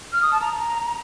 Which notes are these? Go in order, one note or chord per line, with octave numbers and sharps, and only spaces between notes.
F6
D#6
A5
A#5